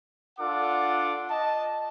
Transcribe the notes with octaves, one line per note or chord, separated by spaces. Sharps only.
D4 F4 A4 F#5 D6
D#5 A5